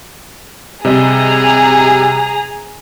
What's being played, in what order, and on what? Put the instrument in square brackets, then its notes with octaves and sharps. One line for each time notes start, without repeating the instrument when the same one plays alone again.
[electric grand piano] C3 G3 D#5 [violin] G#4 A#5